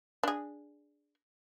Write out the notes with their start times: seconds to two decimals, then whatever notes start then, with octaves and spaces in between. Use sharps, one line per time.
0.23 D4 G#4